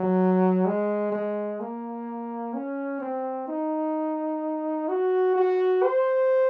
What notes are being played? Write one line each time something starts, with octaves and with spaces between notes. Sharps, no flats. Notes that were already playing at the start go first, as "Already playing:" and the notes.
Already playing: F#3
G#3
G#3
A#3
C#4
C4
D#4
F#4
F#4
C5